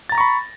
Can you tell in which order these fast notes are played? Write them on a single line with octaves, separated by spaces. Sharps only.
A6 A#5 A#6 C#6 B5